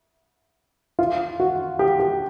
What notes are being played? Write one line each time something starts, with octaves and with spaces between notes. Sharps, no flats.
F4
F#4
G4
G4